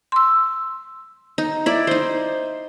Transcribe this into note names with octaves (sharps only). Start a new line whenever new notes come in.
C6 E6
D#4
E4 D5
D#4 C5